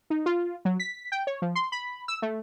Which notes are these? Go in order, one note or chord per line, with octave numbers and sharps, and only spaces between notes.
D#4
F4
F#3
B6
G5
C#5
F3
C6
B5
E6
A3